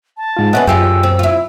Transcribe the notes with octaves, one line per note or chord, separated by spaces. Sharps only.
A5
G#2 F4
B3 C#4 B4 D#5 E5 F#5
F#2 F4 G4 G#4 G5 E6
C4
E4 F4